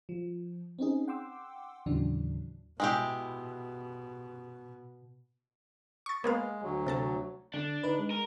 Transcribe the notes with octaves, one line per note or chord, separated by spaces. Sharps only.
F3
C4 C#4 D#4 G#4
F#5 G5 C6 D6 E6
D#2 A2 C#3 E3 F#3 D4
B2 G#3 E4 G4
C#6 A6
G#3 A#3 B3 F5
D2 F#3
C3 A4 A5
D3 D4
D3 D#4 B4
G#3
A#4